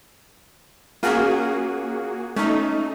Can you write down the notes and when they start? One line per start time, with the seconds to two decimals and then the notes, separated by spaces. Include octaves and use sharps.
1.03 A#3 C#4 F4 F#4 G#4
2.36 A3 C#4 D#4